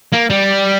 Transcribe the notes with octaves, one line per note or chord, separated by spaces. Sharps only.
A#3
G3